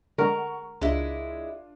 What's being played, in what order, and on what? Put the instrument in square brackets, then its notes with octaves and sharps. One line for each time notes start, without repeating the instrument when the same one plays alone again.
[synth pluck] D3 G#3 [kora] A#4 [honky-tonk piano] F#5 C#6
[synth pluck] C#2 [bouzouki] G#3 E4 [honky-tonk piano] D4 F4